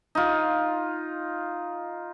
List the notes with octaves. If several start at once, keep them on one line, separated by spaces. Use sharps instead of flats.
D#4 F4